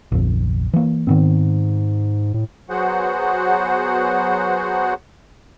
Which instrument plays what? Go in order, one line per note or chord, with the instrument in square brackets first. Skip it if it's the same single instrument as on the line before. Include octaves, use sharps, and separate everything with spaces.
[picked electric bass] F1 A#1
E3 A#3
[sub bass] G#2 [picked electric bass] D#3 B3 C4
[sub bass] A2
[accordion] F#3 B3 F#4 G#4 C5 F#5